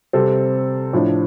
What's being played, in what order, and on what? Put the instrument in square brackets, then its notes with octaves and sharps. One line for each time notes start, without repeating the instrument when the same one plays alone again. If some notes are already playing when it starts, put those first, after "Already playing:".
[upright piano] C3 G3 C4 A4
A2 F3 D4